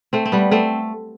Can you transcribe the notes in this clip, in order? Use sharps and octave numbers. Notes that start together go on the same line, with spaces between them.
A3 C4
C4
G3 B3
A3 C4